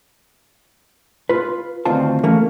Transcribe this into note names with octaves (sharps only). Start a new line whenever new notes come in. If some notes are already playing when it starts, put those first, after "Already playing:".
F4 B4
D2 D#3 C4 F4 A5
E3 A3 A#3 C#4